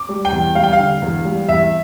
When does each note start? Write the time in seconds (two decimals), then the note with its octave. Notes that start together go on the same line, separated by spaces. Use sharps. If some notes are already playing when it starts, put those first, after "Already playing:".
Already playing: D6
0.09 G3
0.25 G5
0.32 E2
0.55 G3 F5
0.64 G5
0.73 F5
0.79 D3
1.02 E2
1.25 G3
1.49 E2 E5